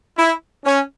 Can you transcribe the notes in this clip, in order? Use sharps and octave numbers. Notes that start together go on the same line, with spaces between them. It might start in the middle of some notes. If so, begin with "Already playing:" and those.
E4
C#4